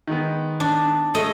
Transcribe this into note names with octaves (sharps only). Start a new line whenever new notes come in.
D#3 G#3 B3
D4
G#3 A3 A4 D#5